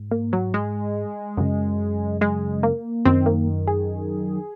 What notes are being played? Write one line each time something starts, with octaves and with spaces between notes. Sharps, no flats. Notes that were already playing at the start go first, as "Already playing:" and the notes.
Already playing: G#2
A#3
F#3
G#3
F#2 C#3
G#3
A#3
F#2 D#3 C4
A#3
G#4